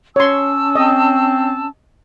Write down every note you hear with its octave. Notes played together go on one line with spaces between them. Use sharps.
C#4 C#5 A5 C6 E6
C4 D#5